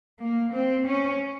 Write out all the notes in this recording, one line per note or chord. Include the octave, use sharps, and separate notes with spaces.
A#3
C4
C#4